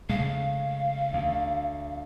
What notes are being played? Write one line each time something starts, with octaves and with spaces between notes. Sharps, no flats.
C#3 G#3 A3 F5
D2